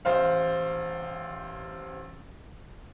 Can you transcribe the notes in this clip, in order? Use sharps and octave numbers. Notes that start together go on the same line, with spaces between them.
A1 C5 F5